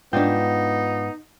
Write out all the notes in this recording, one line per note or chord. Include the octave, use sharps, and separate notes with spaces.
G#2 B3 D4 D#4 F4 G5